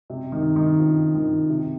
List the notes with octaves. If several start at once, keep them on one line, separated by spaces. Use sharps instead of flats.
C3
D#3
D#3
F3
D#3
C3